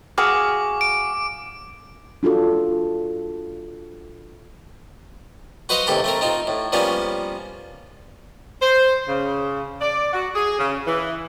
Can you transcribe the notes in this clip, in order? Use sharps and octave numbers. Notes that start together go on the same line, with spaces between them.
F#4 G#4 F5 D6
D7
D4 F4 F#4 A4
F#4 B4 C5 D#5 F5 F#5
D#2 C3 E3 G4 A4 B5
A3 C4 A#4
C4 D#4 F4
A2
F3 G3 A#3 B3 C#4 F4
C5
C#3
D5
F#4
G#4
C#3
E3